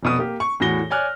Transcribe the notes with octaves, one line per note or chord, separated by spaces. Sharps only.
F1 B2 D#6
A#3 G4
C#6
E2 A2 F#4 A#6 G7
C#5 D5 G#5 F6 F#6